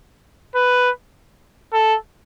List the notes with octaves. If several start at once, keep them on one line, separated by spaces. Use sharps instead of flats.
B4
A4